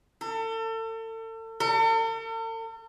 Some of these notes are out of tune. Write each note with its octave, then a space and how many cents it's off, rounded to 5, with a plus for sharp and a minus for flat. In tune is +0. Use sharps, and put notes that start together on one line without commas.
A4 +35
A4 +45